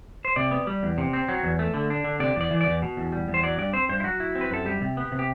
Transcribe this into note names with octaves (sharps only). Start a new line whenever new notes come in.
C5
C3 D5
B3
G3
E2
C3
C4
F#3
E2
A3
D3
D4
D3
C3 D5
E2 D5
E3
D5
E2
B2
E2
G3
E2
C5
F#3 D5
G2 D5
C4 C5
G2 C5
E4
F#3 F#4
E4
C4
B4
F#2 A4
G3 G4
C3
B3
C3
G4